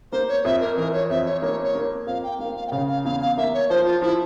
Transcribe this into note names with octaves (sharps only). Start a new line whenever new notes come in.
A#3 C5
C#5
F2 E5
A#4
E3 A#4
C#5
F2 E5
C#5
A#3 C#5
C#5
A#3
F2 F5
G5
A#3 F5
F5
G5
C#3 F5
F5
E2 F5
F5
A#3 E5
C#5
F3 C5
F4
F3 E4